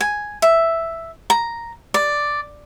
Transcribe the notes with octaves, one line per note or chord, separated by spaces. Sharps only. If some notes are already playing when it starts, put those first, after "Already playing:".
G#5
E5
A#5
D5